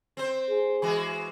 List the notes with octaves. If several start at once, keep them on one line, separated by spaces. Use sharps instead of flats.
C4 C5
G#4
E3 G#3 F#4